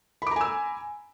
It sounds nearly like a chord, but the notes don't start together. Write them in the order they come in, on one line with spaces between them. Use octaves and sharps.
B5 D6 A#5 G#5 E6